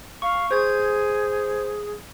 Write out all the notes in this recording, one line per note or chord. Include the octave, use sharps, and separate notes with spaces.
F5 C#6
G#4 C5 G#6